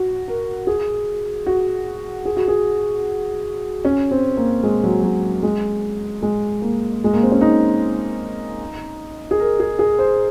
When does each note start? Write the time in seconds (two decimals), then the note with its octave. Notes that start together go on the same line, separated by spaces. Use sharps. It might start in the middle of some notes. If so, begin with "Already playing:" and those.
Already playing: F#4
0.28 A#4
0.67 G#4
1.46 F#4
2.25 G#4
2.37 F#4
2.48 G#4
3.85 C#4
4.11 C4
4.37 A#3
4.63 G#3
4.84 F#3
5.03 F#3
5.43 G#3
6.23 G#3
6.62 A#3
7.04 G#3
7.14 A#3
7.23 C4
7.32 C#4
7.41 D#4
9.31 G#4
9.40 A#4
9.60 G#4
9.79 G#4
9.99 C5